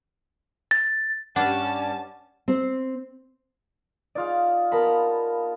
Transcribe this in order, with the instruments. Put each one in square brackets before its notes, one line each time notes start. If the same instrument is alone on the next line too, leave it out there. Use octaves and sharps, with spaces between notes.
[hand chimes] A6
[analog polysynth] G2 G3 C#4 [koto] D4 [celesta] F#5 [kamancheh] A5
[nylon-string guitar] C4 C5
[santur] D#4 F4 G#4 [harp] D5 F6
[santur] A#3 B3 [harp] A#4 A5 B5